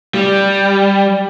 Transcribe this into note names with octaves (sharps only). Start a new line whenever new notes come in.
G3